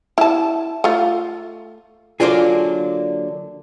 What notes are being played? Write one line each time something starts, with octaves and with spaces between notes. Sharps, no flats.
E4 A5
A3 F4
D3 F#3 A#3 D4 F4 G#4